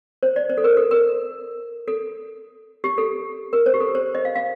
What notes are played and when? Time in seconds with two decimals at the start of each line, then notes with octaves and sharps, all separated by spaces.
0.23 C5
0.36 D5
0.50 C5
0.58 A4
0.64 A#4
0.77 A4
0.91 A#4
1.88 A4
2.84 G4
2.98 A4
3.53 A#4
3.66 C5
3.74 G4
3.80 A4
3.95 C5
4.15 D#5
4.25 F5
4.35 F5